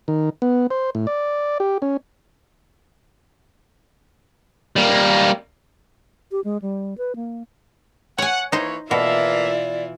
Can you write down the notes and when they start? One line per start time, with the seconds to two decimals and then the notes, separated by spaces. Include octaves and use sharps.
0.08 D#3
0.42 B3
0.70 C5
0.95 A2
1.07 D5
1.60 G4
1.82 C#4
4.76 G3 A#3
6.31 G4
6.44 G#3
6.62 G3
6.98 B4
7.16 A#3
8.18 C#5 F#5 G#5
8.52 E3 A#3 D#4 C5 C#5
8.91 B2 E3 A#3 E4 F4 A4 D5 E5